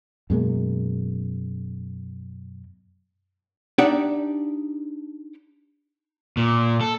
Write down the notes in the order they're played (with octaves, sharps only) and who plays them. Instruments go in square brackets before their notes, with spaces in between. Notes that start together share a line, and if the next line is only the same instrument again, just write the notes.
[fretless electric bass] F#2 B2 G#3 A#3
[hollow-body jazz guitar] D4 D#4 G4 D5 E5 F#5
[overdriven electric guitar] A#2
A4